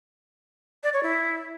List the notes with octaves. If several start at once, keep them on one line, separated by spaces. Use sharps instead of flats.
D5
C#5
E4